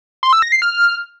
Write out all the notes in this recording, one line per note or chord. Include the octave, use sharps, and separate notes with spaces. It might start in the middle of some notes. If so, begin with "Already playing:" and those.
C6
E6
A#6
C7
F6